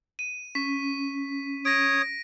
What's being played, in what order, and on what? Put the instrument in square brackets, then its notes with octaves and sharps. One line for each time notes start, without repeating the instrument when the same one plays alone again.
[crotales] D#7
[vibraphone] C#4 [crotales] B6
[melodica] C#5 D#6 [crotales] A#6 D7